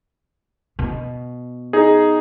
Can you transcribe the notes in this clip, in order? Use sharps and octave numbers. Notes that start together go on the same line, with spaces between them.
B2
D#4 G#4